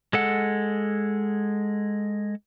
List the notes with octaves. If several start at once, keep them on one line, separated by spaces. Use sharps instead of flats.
G#3 A4 F#5